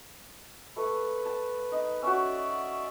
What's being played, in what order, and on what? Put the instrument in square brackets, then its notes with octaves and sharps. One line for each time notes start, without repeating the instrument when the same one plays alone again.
[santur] A3 [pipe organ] B4
[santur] A5
D#4
[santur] C#4 F#4 [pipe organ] D5 E5